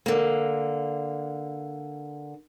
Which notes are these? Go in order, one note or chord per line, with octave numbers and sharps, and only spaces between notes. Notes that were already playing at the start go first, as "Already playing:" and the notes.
D3 A#3